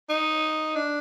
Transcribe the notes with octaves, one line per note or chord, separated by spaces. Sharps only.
D#4
D4